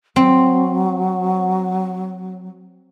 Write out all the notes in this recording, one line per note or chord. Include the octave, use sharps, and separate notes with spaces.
F#3 C4